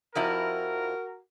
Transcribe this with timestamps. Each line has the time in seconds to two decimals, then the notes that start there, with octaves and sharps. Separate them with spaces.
0.15 F2 F3 E4 F#4 A#4